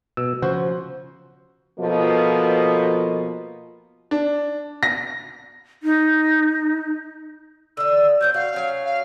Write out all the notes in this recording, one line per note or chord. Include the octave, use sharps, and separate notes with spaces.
B2 E6
C#3 F3 F#4 C5
B2 F3 A#3 F4 A4 D#5
D4
A#6
D#4
D3 D#5 E6
F#3 C4 D4 G6
F#4 F5
F#3 C#4
F5